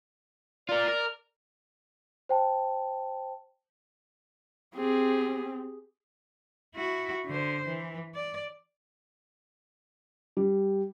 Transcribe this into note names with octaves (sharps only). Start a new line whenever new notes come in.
F4 A#4 D5
A#4
C5 G5 A5
C4 G4 G#4
E4 F#4
D3 C5
E3
D5
G3